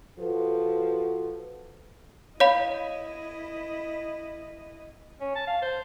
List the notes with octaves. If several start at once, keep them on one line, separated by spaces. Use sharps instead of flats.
F3 F#4 A4 B4
E4 C#5 D#5 F5 B5
C#4
A5
F5
C5